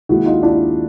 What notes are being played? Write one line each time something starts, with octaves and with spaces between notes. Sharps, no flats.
D#2 D#3 G#3 E4 F#4
D#4 F4
D4 E4